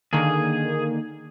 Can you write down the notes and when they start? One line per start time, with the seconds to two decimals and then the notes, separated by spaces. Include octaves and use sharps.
0.13 D3 D#3 A#3 G#4